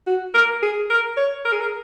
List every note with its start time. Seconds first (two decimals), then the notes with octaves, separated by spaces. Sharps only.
0.07 F#4
0.34 A#4
0.62 G#4
0.90 A#4
1.17 C#5
1.45 A#4
1.53 G#4
1.61 A#4